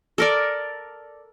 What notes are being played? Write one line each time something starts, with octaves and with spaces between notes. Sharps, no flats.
A4 A#4 D5